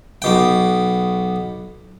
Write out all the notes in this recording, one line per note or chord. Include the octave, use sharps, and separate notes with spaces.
B1 B2 G5